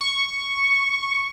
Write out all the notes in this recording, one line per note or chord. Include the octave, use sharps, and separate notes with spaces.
C#6